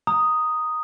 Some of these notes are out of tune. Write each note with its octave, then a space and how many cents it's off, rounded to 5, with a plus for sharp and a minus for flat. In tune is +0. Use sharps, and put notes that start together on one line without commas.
A#5 +0 D#6 +0